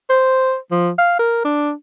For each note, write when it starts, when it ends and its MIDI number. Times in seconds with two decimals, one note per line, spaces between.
0.10 0.56 72
0.71 0.91 53
0.99 1.14 77
1.19 1.41 70
1.45 1.72 62